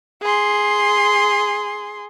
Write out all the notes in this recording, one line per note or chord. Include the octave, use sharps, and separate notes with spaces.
G#4 C6